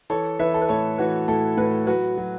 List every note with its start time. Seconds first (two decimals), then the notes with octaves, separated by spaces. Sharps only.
0.10 E3 A4 C#5
0.39 E3 B4 E5
0.54 A4
0.62 B4
0.69 A2 A4 C#5
0.98 E3 F#4 B4
1.28 A2 E4 A4
1.57 A2 F#4 B4
1.87 F#3 F#4 B4
2.18 F#3